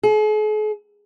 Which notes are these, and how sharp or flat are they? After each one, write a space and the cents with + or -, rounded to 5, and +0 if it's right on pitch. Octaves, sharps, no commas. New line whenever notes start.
G#4 +45